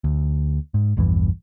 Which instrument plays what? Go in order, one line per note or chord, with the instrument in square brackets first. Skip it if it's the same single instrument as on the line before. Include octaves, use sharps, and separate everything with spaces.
[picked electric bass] D2
G#2
A#1 E2 G2 E3